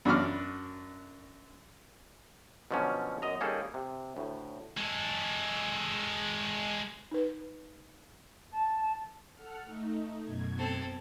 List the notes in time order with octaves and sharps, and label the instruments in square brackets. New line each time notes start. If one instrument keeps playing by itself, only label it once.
[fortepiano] F#2 D4 F#4 B5 D6 F6
[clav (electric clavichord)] B2 D3 F3 F#3 C#4
F#2 D#5 A#5
G3 A#3 C#4 D#4 G#4 A4
C3
D2 A2
[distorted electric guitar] G#3 A4
[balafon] D#4 B4
[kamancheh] A5
[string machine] A4 F#5 F6
A3 D#4
F#2 B2 G#6
[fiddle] C4 A4